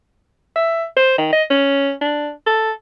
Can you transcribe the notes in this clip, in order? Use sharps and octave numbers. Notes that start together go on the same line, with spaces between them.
E5
C5
D#3
D#5
C#4
D4
A4